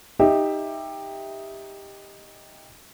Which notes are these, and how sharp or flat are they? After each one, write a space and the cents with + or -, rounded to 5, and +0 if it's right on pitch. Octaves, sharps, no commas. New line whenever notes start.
D#4 +0 G4 +15 E5 +0